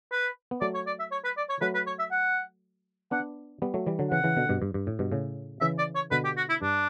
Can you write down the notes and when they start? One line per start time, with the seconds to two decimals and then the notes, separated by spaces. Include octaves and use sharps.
0.12 B4
0.51 B3
0.61 F#3 A3 D5
0.74 C#5
0.87 D5
0.99 E5
1.12 C#5
1.25 B4
1.37 D5
1.50 C#5
1.61 F#3 A3 B4
1.75 B4
1.87 C#5
1.99 E5
2.11 F#5
3.11 B3 D4 F#5
3.62 G3 B3
3.74 F#3 A3
3.86 E3 G3
3.99 D3 F#3
4.11 C#3 E3 F#5
4.24 C#3 E3
4.37 B2 D3
4.49 G2 B2
4.62 G2
4.74 G2
4.87 A2
4.99 G2 B2
5.12 A2 C#3
5.61 C#3 E3 E5
5.79 D5
5.95 C#5
6.11 B2 D3 B4
6.24 G4
6.37 F#4
6.49 E4
6.62 G2 D4